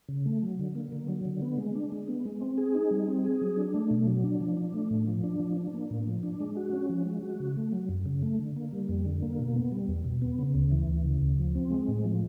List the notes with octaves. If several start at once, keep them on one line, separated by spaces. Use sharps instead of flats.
C#3
A3
F#3
D3
A#3
D3
F#3
D3
B3
G#3
D4
G#3
B3
G#3
C4
G#4
D#4
G3
C4
G#4
F#3
D4
A3
B2
F#3
D4
F3
D4
A3
A2
F3
D4
F3
D4
A#3
A2
F3
D4
G#3
F#4
C#4
F3
G#3
F#4
C#3
A3
F#3
F#2
C#3
A3
D3
A#3
G3
F2
D3
A#3
B2
B3
G3
E2
B2
B3
C#3
D2
E3
D2
C#3
D2
F3
C4
G#3
A2
F3